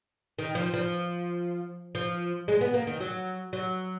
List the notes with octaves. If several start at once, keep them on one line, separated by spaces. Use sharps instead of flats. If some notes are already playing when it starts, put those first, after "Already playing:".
D#3
F3
F3
F3
G#3
B3
A#3
D#3
F#3
F#3